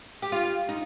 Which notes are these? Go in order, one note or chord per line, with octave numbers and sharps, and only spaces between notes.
G4
F4
D#4